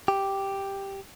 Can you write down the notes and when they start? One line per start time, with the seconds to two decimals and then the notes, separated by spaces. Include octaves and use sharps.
0.08 G4